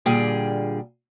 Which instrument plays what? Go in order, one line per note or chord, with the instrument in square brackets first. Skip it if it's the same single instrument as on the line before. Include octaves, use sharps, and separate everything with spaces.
[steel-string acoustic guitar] A#2 D3 G3 G#4 G5